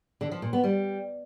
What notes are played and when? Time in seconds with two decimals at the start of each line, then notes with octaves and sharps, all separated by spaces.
0.21 D3
0.32 F3
0.42 A#2
0.53 B3
0.64 G3